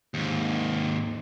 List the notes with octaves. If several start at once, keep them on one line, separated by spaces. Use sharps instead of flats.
D#2 G#2